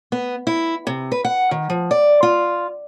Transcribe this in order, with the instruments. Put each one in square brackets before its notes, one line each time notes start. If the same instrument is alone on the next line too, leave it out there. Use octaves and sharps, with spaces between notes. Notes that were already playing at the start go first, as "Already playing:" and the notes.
[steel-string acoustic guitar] B3
E4
C3
B4
F#5
D#3
F3
D5
F4